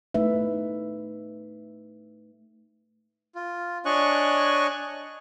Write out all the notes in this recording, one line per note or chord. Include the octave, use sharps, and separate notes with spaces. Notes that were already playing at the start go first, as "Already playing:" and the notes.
A3 D#4 B4 E5
F4
D4 C#5 D#5 G#5 C#6 F#6